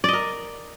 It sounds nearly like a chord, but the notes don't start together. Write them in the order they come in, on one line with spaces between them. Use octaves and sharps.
D5 D#5 A#4